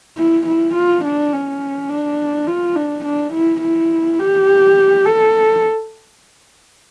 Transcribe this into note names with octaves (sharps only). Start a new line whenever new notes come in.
E4
E4
F4
D4
C#4
D4
F4
D4
D4
E4
E4
G4
A4